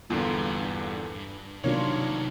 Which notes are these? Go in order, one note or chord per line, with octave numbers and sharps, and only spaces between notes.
E2 G2 A#2 D3 F4
C3 D#3 F#3 A#3 D4 F4 C#5